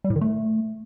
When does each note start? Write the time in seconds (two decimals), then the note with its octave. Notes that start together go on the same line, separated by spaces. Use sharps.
0.04 G3
0.10 A2
0.16 D#3
0.21 A3